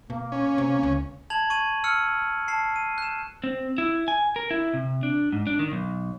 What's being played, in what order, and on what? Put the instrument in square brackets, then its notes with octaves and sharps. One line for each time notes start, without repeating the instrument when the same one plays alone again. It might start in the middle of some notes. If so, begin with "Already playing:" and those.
[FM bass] B2 [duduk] A#3
[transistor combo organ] C#4
[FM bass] C3
C#2
[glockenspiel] A5 G#6 F7 F#7
C#6 G#6 D#7 F#7
E6 F6 C#7
A5 C7
D#7
F#6 E7
[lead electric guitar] C4
E4
G#5
A#4
E4
C3
D4
G#2
D4
D#3
B1